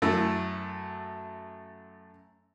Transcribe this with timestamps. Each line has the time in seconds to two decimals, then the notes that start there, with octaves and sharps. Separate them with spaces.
0.02 F#2 A3 E4